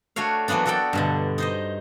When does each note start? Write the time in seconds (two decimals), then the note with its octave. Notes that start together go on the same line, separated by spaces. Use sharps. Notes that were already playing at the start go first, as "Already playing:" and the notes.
0.16 A3 D4 F#4 C#5 F5
0.48 E3 F#3 A#3 B3 D4
0.66 B3 F#4 A4 D5 G5
0.93 G2 B2 D3
1.38 D#4 C5 D#5